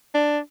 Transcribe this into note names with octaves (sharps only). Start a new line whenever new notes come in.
D4